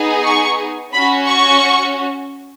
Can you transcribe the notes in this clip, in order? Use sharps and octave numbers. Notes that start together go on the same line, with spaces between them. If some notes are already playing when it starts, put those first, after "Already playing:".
Already playing: B3 D#4 G#4
C#6
C#4 F#4 B5
C#6